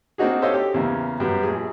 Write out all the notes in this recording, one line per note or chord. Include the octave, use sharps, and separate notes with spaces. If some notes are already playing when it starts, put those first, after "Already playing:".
A#3 C4 D4 D#4 F#4 G#4
G4 A4 C5 C#5 D#5 F5
G4
E2 C#3 A#3
F#2 G3 B3
A#1 G#4